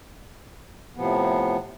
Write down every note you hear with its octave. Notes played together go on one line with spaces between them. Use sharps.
A2 C3 F3 B3